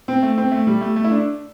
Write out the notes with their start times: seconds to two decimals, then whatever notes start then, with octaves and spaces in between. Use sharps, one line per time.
0.08 C4
0.23 A3
0.38 C4
0.52 A3
0.67 G3
0.81 A3
0.96 A3
1.04 E4
1.11 D4